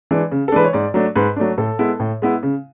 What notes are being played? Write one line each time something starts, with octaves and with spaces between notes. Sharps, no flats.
E3 G#3 D4
C#3
A4
E3 G#3 D4 B4
C#5
G#2 D5
F#3 A3 D4
G#2 B4
F#3 A3 D4
A2 A4
G#3 B3 E4
A2
G#3 B3 E4
C#3